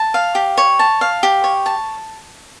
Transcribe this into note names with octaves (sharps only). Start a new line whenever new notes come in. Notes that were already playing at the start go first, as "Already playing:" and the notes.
Already playing: A5
F5
G4
C#5
A5
F5
G4
C#5
A5